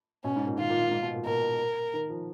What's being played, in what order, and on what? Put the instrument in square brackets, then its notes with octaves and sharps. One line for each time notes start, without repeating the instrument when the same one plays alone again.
[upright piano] B2 [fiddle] C#4
[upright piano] G#2
A#2
[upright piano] D#3 [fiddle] F4
[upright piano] A#2
G#2
G#2
B2
A#2
[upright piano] B2 [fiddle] A#4
[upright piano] D#3
F3